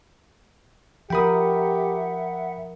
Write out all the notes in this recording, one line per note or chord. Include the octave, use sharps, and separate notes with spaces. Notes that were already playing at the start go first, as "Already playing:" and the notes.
F3 G4 A#4 E5 F#5 G5 B5 D#6